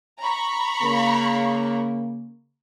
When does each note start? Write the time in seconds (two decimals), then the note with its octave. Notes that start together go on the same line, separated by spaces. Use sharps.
0.21 A#5 B5 C#6
0.83 C#3 A#3